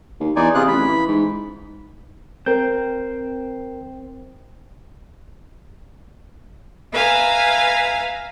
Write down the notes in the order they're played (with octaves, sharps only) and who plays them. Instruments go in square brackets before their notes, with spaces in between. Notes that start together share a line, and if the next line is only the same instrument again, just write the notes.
[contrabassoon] D#2
[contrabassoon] E2 [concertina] D#4 D5 G#5
[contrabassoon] C3 [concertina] F4 G#4 F#6
[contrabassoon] A1 [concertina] B5
[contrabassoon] E3
G#2
[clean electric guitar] C4 [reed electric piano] A#4 G6
[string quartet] B4 E5 F5 G#5 A#5